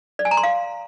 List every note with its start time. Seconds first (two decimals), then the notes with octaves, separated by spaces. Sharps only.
0.19 D5
0.25 G#5
0.31 A#5
0.37 C6
0.43 F5